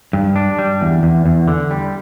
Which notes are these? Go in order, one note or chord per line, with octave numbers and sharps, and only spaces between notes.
G2
D4
G3
E2
E2
E2
D3
G3